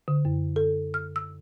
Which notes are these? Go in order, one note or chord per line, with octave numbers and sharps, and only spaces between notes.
D3
F#2
A4
F6
E6